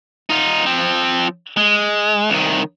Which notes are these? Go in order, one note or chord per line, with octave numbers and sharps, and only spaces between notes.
D#4 F4
F3 C4
G#3
C2 D#3